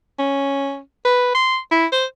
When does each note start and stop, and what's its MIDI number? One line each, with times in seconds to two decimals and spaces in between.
0.19 0.79 61
1.05 1.29 71
1.35 1.58 84
1.72 1.86 64
1.92 2.05 72